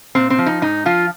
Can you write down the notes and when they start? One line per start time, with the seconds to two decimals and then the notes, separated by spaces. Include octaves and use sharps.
0.15 A#2 C4
0.30 C4
0.38 F3
0.46 D#4
0.62 G#2 D#4
0.85 F3 F4